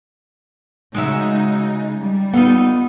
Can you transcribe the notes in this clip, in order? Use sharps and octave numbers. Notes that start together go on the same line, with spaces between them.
C#3 G#3 D#4 F#4 E5
G3
B3 D#4 F4 A4